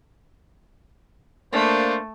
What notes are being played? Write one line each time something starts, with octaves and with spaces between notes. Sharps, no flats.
A3 A#3 D4 C5